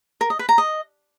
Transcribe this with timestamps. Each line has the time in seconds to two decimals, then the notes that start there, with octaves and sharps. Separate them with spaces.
0.21 A#4
0.30 D#5
0.39 B4
0.49 A#5
0.58 D#5